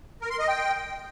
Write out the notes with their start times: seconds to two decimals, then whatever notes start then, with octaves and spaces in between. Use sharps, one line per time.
0.22 A#4
0.30 C6
0.39 D#5
0.48 G5